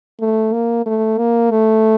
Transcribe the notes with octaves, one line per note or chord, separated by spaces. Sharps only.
A3
A#3
A3
A#3
A3